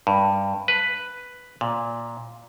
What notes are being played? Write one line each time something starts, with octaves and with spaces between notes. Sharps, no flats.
G2
B4
A#2